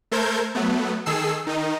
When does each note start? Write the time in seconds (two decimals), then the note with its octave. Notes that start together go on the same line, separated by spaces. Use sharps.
0.11 A3 A4 A#4 C5 G6 G#6
0.55 F#3 A3 B3
1.06 D#3 G#4 A4 E6 C7
1.47 D#3 D#4